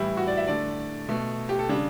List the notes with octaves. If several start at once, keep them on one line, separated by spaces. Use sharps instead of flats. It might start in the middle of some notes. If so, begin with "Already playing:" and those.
Already playing: A2 E3 G3 E4
F#4
D5
E5
D3 A3 D5
B2 A3
G4
A4
C#3 G3 D4